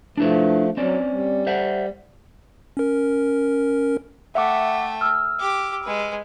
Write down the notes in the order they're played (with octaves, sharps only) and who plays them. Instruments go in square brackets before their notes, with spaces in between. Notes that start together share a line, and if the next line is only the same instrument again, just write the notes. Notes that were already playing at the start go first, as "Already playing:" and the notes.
[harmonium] F3 A3 [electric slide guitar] D4 E4 B4
[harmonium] F#3 [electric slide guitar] C4 C#4 D5
[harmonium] G3
[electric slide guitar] C5 E5 F#5
[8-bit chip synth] C#4 A#4
[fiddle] A3 G5 [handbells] E5 F#5 D6
[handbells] E6 F6
[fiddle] G4 D6
G#3 B4